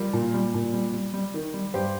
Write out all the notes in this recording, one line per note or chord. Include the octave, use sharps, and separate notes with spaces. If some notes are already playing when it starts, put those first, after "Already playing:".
Already playing: G3 F4 A#4
A#2
G3
A#2
G3
G3
G3
D#3
G3
G2 G4 C5